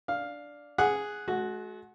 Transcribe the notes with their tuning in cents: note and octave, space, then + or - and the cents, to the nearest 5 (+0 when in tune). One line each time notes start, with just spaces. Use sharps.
D4 -5 F5 +5
G#4 +0 F#5 +0
G#3 +45 F#4 +0